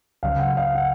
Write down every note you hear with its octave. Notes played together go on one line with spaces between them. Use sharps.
C#2 C#3 F#3 F5
F#5
F5
F#5